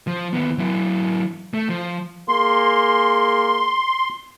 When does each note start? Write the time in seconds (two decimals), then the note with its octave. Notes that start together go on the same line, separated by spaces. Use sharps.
0.07 F3
0.33 D#2 B3
0.58 F#3 E4
1.54 A3
1.69 F3
2.28 A#3 G#4 C6